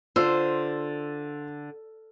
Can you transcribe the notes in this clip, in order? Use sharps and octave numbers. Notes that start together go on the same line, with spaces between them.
D3 F4 C5 E6